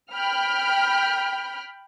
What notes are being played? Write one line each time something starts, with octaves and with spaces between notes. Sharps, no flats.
G5 B5 F6